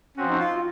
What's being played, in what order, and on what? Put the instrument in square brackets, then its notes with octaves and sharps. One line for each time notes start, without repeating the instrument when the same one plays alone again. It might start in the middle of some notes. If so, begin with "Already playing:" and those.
[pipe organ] F3 C4 F#4 [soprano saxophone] C#4
[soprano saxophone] D#4
F4
F4